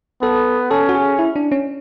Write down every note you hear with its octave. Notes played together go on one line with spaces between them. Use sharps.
B3 A4
C#4 A4
F#4
G#4
E4
D4
C#4